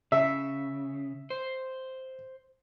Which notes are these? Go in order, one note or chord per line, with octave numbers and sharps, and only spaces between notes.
C#3 E5
C5